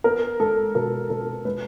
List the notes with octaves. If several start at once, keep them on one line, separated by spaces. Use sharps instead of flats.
B3 A#4
G#3 A4
B2 A#4
B2 A#4
G#3 B4